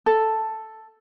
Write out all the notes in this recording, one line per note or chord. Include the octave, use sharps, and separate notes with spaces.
A4